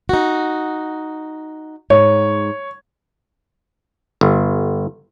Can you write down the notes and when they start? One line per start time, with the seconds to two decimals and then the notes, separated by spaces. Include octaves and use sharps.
0.09 D#4 F#4
1.90 G#2 C#5
4.21 G1